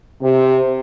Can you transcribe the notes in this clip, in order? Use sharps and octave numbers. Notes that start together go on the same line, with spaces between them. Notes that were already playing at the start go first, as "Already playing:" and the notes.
C3